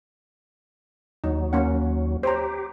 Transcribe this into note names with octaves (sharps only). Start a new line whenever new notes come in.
D#2 F#3 D#4
A#3 C#4 F#5
G4 C5 C#5 A#5